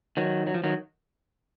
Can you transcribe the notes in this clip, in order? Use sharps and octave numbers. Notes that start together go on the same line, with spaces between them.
D#3 F#3
F#3
F3
D#3 F#3